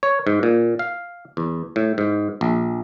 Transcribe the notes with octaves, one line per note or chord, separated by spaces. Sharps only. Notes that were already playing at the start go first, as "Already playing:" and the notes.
C#5
G#2
A#2
F5
E2
A2
G#2
A#1